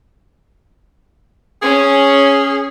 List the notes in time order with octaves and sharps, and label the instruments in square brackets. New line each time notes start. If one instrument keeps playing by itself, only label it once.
[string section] C#4 [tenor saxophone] G#4